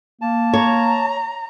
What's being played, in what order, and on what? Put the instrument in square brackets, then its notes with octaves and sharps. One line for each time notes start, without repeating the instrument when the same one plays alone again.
[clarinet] A#3 [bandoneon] A5
[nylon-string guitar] C#5 [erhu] A#5